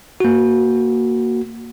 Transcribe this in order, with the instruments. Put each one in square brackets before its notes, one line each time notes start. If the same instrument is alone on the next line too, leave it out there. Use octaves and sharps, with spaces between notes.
[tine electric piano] A#3 F#4